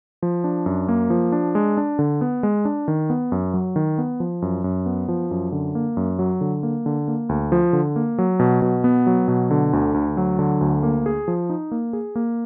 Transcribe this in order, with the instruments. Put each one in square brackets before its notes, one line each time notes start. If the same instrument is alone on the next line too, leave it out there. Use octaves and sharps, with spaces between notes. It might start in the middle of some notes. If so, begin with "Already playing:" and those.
[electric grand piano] F3
D4
F#2
A#3
F3
D4
G#3
D4
D3
B3
G#3
D4
D#3
B3
F#2
F#3
D#3
B3
F3
F#2
F#2
B3
F3
F#2
D3
A#3
F#2
F#3
D3
A#3
D3
A#3
D2
F3
D3
A#3
F#3
B2
B2
B3
F#3
B2
D3
D2
D2
F#3
D3
D2
A#3
G#4
F3
D#4
A#3
G#4
A#3